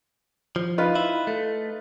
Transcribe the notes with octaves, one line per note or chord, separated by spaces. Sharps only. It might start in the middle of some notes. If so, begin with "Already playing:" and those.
F3
D#4 F4 B4
E4
A3